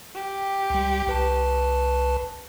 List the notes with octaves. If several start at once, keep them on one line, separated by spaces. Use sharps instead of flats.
G4
C#2 G3
C2 B4 A5